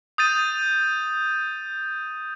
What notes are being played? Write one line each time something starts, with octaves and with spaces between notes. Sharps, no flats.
D#6 G6 A6 D#7